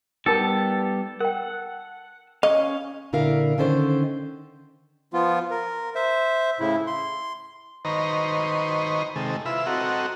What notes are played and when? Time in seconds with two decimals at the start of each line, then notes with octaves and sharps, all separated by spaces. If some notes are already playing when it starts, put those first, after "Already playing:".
0.26 G3 B3 D#4 G4 A4 A#4 A5
1.21 A#4 F#5 G5
2.43 C#4 C#5 D#5 F5
3.13 A#2 D3 E4 A#4 F5
3.58 D3 D#3 C#4 A4 C5
5.13 F3 B3 F4
5.51 A#4
5.95 C5 E5
6.60 A2 C#3 E4
6.87 C6
7.85 D#3 B4 C5 D#5 A#5 C#6
9.16 C3 D#3 G#3 A4
9.45 E4 F4 B4 E5
9.66 C4 F#4 A4 D#5 F#5 A#5